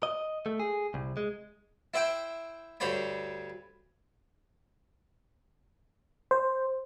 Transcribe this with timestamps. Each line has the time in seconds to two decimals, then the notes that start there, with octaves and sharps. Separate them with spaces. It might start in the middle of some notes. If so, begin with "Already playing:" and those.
0.03 D#5
0.46 A3
0.60 G#4
0.94 C2
1.17 G#3
1.94 E4 C5 E5 G5
2.80 D2 G2 C5 C#5 B5
6.31 C5